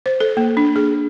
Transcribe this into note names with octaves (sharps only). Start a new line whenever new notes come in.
C5
A4
A#3
D4
G#4